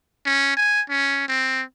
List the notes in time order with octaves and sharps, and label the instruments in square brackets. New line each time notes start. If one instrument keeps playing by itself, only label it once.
[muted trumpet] C#4
G#5
C#4
C4